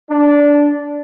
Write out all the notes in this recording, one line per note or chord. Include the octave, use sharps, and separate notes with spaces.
D4